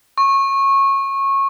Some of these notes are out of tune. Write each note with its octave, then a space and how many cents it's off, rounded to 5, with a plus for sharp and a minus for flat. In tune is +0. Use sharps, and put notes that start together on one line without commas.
C#6 -20